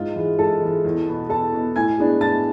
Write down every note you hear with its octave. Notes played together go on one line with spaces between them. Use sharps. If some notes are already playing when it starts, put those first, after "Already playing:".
Already playing: G#2 F4
E3 G#3
G#2 A4 A5
E3 G#3
E2
B2 B3
E2 A4 A5
B2 B3
A2 G#5 G#6
G#3 B3 D4
A2 A5 A6